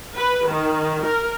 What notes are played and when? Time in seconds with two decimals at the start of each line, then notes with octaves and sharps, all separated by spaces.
0.17 B4
0.48 D#3
1.05 A#4